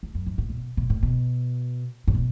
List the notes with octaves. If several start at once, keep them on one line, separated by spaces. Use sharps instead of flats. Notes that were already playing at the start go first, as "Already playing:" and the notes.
E2
F#2
G#2
A2
B2
B2
A2
B2
A2
B2